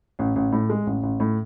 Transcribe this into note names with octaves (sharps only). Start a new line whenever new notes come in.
A1
A1
A2
G#3
A1
A1
A2